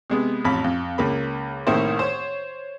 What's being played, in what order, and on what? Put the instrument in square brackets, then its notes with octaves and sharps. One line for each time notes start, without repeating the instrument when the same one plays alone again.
[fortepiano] C3 G#3 B3
A1 F2 B5
F2
C#2 A#3 B5
C2 A2 D#3 A#3 E4 C5
C5 C#5